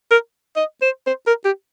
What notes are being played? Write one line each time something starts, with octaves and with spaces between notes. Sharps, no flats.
A#4
D#5
C5
C5
A#4
G4